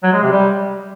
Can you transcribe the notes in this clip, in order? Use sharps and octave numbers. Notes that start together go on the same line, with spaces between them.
F#3
G#3
C3
G3